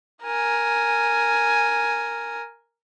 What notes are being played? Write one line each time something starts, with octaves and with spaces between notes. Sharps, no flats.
A#4 G#5